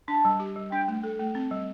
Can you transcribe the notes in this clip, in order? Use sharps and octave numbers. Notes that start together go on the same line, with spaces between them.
D4 A5
G3
G4
G3
D4 G5
A3
A4
A3
C4
G3